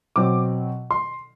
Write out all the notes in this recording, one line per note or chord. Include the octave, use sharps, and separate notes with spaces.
B2 F#3 C4 D6
C6